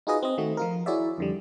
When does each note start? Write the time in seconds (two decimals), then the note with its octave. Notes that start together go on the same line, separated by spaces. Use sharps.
0.07 D#4 F4 F#4 G#4 B4 D#5
0.23 C4 D#5
0.38 D#3 A3 F#4
0.57 F3 F4 A#4
0.86 E4 F#4 G#4 C#5 D5 E5
1.18 F2 D3 G3